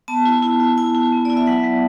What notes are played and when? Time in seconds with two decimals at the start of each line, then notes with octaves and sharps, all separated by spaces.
0.08 B3 A5
0.26 E4
0.42 E4
0.60 E4
0.78 E4 G#5
0.95 E4
1.12 B3
1.25 E4 D5
1.37 E5
1.47 F#3 F#5
1.64 F#3